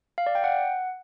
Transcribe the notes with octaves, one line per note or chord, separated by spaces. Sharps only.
F5
D5
G5
F#5